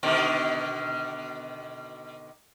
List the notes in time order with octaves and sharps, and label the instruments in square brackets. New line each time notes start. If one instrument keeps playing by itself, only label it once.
[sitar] B2 D3 D#3